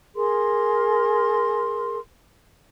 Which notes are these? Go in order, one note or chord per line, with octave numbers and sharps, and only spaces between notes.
G#4 A#4 C6